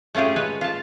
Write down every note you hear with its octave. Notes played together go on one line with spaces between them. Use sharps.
A3 C#4 F4 G4 G#4
G#3 B4 C#5 G#5
F4 A5